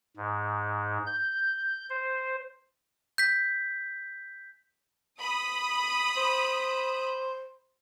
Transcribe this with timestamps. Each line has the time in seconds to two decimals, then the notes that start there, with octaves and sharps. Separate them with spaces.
0.17 G#2
1.07 G6
1.90 C5
3.18 G6 B6
5.20 B5 D#6
6.17 C5